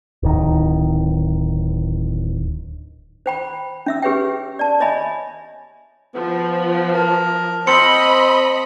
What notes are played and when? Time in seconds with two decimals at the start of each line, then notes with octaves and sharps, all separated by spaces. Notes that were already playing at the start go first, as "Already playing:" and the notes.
0.23 D1 D#3
3.26 C5 G5 B5
3.86 C#4 E5 E6
4.02 G4 G#4 B4 C#5 E5 G5
4.59 D5 A5
4.80 C#5 D#5 E5 G#5 B5
6.15 F3 B3
6.95 A#4 A5
7.67 C4 D#5 B5 C6 C#7